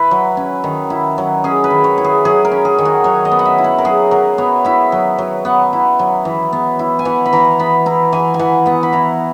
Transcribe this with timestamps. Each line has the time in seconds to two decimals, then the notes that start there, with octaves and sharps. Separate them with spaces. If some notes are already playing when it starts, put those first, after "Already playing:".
Already playing: E4 B4
0.11 F#3
0.37 C#4
0.64 D#3
0.90 E4
1.18 F#3
1.44 C#4 G#4
1.64 B4
1.71 D#3
1.84 C#5
1.98 E4
2.04 G#4
2.25 F#3 G#4
2.45 A#4
2.52 C#4
2.65 G#4
2.78 D#3
2.85 F#4
3.04 F#3 C#5
3.25 D#5
3.31 B3
3.39 F#5
3.45 E5
3.58 E4
3.64 F#5
3.78 A#4
3.85 F#3 G#4
4.11 F#3 A#4
4.38 B3 C#5
4.65 E4 E5
4.92 F#3
5.18 F#3
5.45 B3 F#5
5.73 E4
5.99 F#3
6.25 E3
6.53 B3
6.79 E4
6.99 G#5
7.05 E3 F#5
7.26 B5
7.33 E3 A#5
7.59 B3 B5
7.86 E4 A#5
8.13 E3 G#5
8.34 G#5
8.39 E3 F#5
8.66 B3 F#5
8.83 B5
8.93 E4 A#5